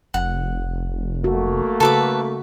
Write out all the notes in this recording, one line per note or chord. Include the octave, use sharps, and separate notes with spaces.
F1 F#5
A3 A#3 F#4
C#3 F#4 A4 B4 D6